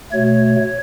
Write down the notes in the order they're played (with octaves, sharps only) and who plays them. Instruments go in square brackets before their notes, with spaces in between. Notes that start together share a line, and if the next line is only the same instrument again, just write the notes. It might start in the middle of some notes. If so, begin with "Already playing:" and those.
[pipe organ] B2 A3 C#5